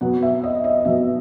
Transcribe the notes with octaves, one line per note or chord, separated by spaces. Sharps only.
B2 F#3 B3 F#5
E5
D#5
D#5
D#5
B2 F#3 B3 E5